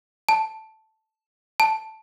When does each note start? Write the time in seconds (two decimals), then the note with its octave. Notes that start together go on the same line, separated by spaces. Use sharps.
0.29 A5
1.60 A5